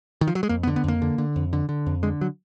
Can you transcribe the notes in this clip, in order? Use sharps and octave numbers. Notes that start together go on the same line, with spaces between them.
D#3
F3
F#3
G#3
F2 A#3
B3
D3
B3
F2 A#3
D3
D3
F2
D3
D3
F2
D3 G#3
F#3